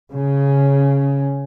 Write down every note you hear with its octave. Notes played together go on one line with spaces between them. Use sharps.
C#3